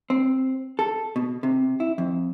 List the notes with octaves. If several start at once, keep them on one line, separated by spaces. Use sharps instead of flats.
C4
A4
B2
C3
E4
F2